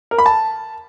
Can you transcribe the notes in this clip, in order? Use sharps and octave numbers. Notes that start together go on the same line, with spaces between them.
A#4
B5
A5